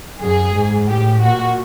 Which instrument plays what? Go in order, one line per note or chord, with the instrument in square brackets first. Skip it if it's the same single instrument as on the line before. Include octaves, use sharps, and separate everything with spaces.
[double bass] F#2 [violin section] G#4
[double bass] G#2
[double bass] A2 [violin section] G4
[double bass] A#2 [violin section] F#4